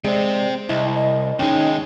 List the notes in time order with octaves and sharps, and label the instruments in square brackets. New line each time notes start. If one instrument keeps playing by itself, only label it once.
[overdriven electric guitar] C3 C4 [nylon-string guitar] G#3 [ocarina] D5
[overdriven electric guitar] C2 [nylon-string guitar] E4 [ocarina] D#5
[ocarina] D#5
[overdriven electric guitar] D#2 G#3 [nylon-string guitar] C#4 D#4 [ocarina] G5